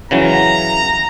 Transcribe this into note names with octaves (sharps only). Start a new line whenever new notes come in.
C#3 E3 F#3 A#5